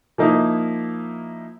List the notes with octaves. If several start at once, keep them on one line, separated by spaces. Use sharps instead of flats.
F3 A#3 D#4 E4